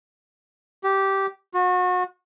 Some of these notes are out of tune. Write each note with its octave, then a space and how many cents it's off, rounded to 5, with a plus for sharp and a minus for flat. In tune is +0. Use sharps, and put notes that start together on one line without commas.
G4 -10
F#4 -35